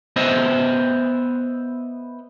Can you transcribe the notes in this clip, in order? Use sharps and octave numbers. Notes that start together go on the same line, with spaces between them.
B3 C5 D#5 E5